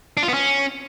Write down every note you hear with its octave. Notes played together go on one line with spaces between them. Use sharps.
D4
F4
B3
C#4